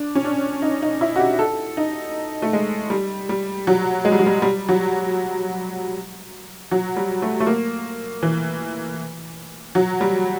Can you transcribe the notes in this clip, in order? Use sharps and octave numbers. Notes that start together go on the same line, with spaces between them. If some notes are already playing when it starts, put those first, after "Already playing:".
Already playing: D4
C#4
D4
D#4
D#4
E4
F#4
G4
A4
D#4
A3
G#3
G3
G3
F#3
G#3
G3
F#3
G3
G3
F#3
F#3
G3
A3
A3
A#3
E3
F#3
G3